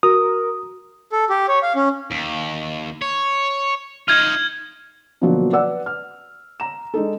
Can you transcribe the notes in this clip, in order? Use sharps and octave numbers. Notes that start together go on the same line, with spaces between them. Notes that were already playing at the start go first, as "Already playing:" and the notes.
F#4 A#4 D#6
A4
G4
C#5
F5
C#4
D#2
C#5
D#4 F4 F6 G#6
B2 D3 F3 F#3 A#3
B4 D5 F#5 E6
F6
A#5 E7
G#3 D4 D#4 A4